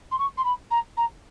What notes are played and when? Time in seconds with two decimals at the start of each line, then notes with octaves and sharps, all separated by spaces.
0.11 C6
0.18 C#6
0.37 C6
0.44 B5
0.71 A#5
0.97 A#5